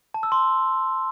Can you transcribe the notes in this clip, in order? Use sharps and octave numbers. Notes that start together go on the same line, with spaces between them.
A5
E6
C6